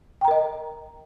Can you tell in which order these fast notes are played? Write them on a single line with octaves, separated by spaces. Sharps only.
G5 A#5 A#4 D#5